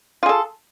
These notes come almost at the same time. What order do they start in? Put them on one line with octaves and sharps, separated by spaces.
F4 G#4 A4